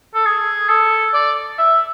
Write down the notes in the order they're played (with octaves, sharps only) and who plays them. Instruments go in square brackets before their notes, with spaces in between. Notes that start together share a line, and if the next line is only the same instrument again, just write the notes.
[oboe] A4
G#4
A4
D5
E5